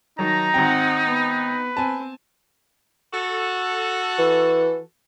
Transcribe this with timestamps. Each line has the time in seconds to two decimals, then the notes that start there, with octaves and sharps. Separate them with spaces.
0.19 D#3 F#3 D#4 A5 A#5
0.54 G#1 C4 F#5 G5
1.08 B3 B4
1.77 C4 G#5 A5
3.14 F#4 A4
4.18 E3